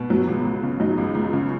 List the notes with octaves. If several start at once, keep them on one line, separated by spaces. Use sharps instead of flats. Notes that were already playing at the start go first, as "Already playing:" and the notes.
Already playing: B2
F#3
C#2
C#2
C#3
F#3 D#4
C#2
C#2
C#3